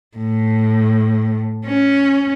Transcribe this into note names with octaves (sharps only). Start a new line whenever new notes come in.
A2
C#4